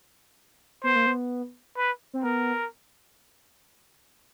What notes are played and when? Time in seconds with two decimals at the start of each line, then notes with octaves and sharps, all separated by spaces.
0.83 B3 C5
0.95 A#3
1.07 B3
1.77 B4
2.14 C4
2.24 B3 A#4